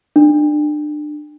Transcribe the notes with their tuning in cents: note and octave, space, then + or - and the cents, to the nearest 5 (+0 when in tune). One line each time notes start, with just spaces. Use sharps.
D4 +30